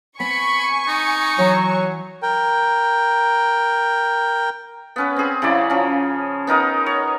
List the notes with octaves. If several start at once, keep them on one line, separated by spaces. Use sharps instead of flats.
B3 C4 G#5 B5 C#6
D#4
E3 F#3 C#5
A#4 G5
B3 C#4 B4
C4 G#4
C#3 F#3 E4 D5
F3 C#4
B3 D#4 A#4 D#5
C#5